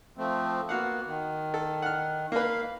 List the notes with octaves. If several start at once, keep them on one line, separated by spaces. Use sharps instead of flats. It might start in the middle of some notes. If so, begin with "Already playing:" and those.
F3 A3 C4
A#3 B3 F#4 F5 F#5
D#3
A4
F#5 F6
A#3 B4 F5